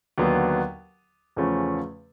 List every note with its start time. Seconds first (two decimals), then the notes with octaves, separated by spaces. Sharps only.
0.18 D#2 D3 F#3 B3
1.36 E2 C#3 F3 A3 C#4